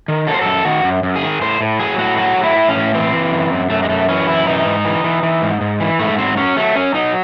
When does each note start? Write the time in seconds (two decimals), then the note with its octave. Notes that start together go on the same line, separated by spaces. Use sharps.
0.08 D#3
0.27 F#3 A4
0.34 C5
0.41 F#2 A4
0.65 D#3 F#4
0.84 F#2
1.03 F#2
1.16 G#4
1.22 D#3
1.41 A2 C5
1.61 A2
1.80 F#3 G#4
1.98 A2 F#4
2.18 F#3 F#4
2.37 A2
2.43 E4
2.56 A2
2.69 C#4
2.75 A2
2.94 E3 C4
3.13 E3
3.32 F#2
3.51 F#2
3.70 F#2 A3
3.83 G#3
3.89 F#2 A3
4.09 E3 C#4
4.27 F#2 E4
4.47 E3 D#4
4.66 G#2
4.85 E3
5.04 E3
5.23 E3
5.42 G#2
5.61 G#2
5.80 E3
5.99 G#2 A3
6.18 F#3 C4
6.37 F#3 C#4
6.56 F#3 A3
6.75 F#3 C#4
6.94 F#3 D#4